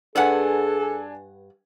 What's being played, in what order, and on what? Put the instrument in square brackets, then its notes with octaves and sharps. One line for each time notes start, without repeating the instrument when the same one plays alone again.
[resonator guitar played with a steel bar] G2 B4 F#5 [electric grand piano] D4 G#5 [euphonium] G#4 [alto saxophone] A4